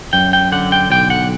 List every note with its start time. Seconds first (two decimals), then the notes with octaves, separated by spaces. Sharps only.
0.13 F#2 G5
0.33 G5
0.52 D3 F#5
0.72 G5
0.90 B1 G5
1.10 F#5